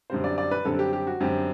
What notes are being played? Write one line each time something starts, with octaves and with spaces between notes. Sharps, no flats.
F#2 D3 G3 C4 C5
D5
D5
B4
F#2 D3 G3 C4 A4
G4
G4
F#4
F#2 D3 G3 C4 G4